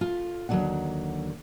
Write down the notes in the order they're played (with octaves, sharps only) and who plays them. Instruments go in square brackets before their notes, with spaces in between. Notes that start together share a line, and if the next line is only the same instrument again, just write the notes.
[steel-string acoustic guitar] F4 A4
D#2 D3 E3 F#3 D4 F#5